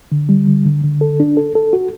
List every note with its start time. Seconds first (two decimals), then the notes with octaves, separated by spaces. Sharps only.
0.12 D3
0.29 G3
0.48 D3
0.65 D3
0.83 D3
1.01 A4
1.20 D4
1.37 A4
1.55 A4
1.73 F#4